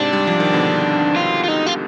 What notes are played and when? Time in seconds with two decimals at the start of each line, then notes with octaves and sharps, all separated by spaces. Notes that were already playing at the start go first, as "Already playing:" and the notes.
Already playing: G#2 C3 D4
0.13 G3
0.27 F3
0.40 D#3
0.53 B2 D3
1.16 F4
1.44 F4
1.48 D#4
1.66 F4